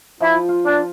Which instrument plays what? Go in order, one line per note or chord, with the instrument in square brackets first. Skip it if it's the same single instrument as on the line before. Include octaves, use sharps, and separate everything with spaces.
[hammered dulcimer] F3 [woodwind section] E4
[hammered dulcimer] F4
[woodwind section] D4